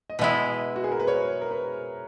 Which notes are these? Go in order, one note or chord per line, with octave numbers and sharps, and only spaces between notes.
D#5
B2 G#3 B3 E4 E5
F#4
G#4
A#4
B4
C#5
A#4
B4